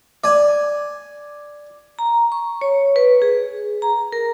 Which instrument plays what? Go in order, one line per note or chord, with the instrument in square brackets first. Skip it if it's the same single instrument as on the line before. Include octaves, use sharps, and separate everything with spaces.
[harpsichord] D5 G#5
[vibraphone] A#5
C#6
C#5
B4
G#4
A#5
A#4